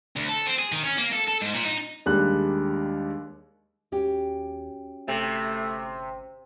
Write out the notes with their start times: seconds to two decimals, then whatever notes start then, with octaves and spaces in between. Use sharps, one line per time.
0.16 D2
0.29 A4
0.47 C4
0.59 G#4
0.72 D#3
0.84 C#4
0.98 A#3
1.13 A4
1.28 A4
1.42 G#2
1.54 A#2
1.66 D#4
2.06 D#2 G3 G#3 D4 F#6
3.92 D#2 C#4 F#4 G4
5.08 G1 C3 A3